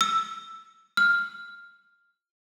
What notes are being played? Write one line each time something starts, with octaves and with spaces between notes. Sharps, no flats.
E6
F6